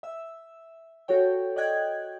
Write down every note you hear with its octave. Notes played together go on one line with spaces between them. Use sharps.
E5 E6
F#4 A4 C#5 G5
D5 D#5 G5 F#6 G#6